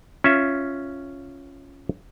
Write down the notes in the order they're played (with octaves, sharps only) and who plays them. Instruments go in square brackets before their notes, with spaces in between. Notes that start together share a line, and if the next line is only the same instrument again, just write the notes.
[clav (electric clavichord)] C#4 F4 E5